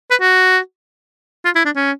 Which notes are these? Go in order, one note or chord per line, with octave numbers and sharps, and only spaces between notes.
B4
F#4
F4
E4
D4
C#4